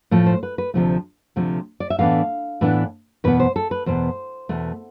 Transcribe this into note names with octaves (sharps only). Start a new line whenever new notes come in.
A2 F3 A3
C5
B4
B4
D2 C3 F3 A3
D2 C3 F3 A3
D5
E5
A2 E3 B3 D4 F5
A2 E3 B3 D4
E2 B2 B3 B4
C5
A4
B4
E2 B2 B3 C5
E2 B2 A3